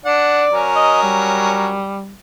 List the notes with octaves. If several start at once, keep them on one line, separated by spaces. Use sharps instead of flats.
D4 D5 F#5
F#3 C#4 A#4
D#5
G3